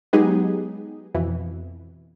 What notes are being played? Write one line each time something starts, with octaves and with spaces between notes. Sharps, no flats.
F#3 G#3 B3 D#4 G4 G#4
F2 B2 E3